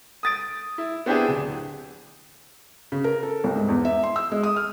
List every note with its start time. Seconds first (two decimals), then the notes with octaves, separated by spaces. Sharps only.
0.23 D#6 A6 D7
0.78 E4
1.06 B3 C4 D4 E4 G4 G#4
1.28 D1
2.92 C#3
3.04 A#4
3.23 A4
3.44 C2
3.56 G#2
3.69 E2
3.85 E5
4.03 C6
4.16 E6
4.32 G#3
4.43 D#6
4.56 F6